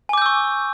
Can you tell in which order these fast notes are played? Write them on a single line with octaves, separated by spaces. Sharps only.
G#5 D6 G6 E6 C#6